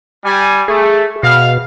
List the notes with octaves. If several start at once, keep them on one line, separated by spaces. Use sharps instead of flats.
G3 G#5
A3 G#4
B2 F5